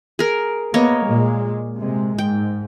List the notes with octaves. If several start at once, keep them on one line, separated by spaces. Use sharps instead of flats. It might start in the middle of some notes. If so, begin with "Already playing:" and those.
G#4 A#4
A#3 B3 C#5 D#5
A#2 G#3
C3 G#3
G#2 G5